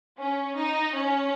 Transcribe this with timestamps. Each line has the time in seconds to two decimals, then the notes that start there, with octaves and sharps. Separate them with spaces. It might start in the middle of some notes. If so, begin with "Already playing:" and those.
0.18 C#4
0.56 D#4
0.94 C#4